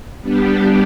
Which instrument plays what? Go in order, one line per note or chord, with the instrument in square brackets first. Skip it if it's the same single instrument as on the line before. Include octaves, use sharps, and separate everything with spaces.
[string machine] G3 B3 D4 G4